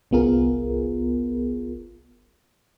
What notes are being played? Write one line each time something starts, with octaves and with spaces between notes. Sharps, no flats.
G1 C2 B3 F4 G#4 A#4